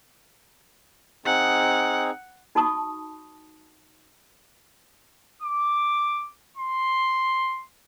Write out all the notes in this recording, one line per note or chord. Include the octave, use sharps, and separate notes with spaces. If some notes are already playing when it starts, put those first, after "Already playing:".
C4 D#4 G#4 F#5
D#4 F#4 A5 B5 C#6 D#6
D6
C6